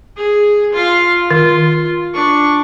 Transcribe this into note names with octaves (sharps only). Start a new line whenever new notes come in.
G#4
F4 F5
D#3 F4
D4 C#6